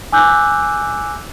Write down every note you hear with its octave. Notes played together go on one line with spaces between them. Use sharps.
G#5 D6 E6 F#6 G6